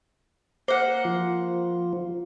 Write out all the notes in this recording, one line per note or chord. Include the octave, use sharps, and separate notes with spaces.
A#3 C5 F#5
F3 F4